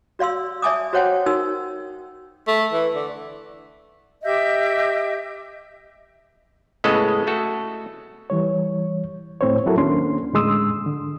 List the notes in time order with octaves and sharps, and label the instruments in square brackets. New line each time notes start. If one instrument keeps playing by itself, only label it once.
[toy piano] F#4 D5 F5 C6 E6
D5 E5 G#5 A5 D6 D#6
F#4 C5 C#5 F#5 G5 A5
D#4 F#4 A#4 E6
[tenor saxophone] A3
E3
D3
[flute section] G4 D#5 E5 G6
[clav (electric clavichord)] A2 C#3 G#3 B3 A4 D#5
A3 F#4 A4
[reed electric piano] E3 G3 C#5
A2 C4 C5 C#5
F#3 E4 F#4 A4 A#4
D#2 A#3 C#4 D4 C6
A2 D3 G#3 C6 D#6 E6
G#2 D3